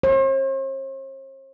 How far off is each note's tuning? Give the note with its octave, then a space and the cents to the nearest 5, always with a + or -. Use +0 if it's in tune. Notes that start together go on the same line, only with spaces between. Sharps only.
C5 +45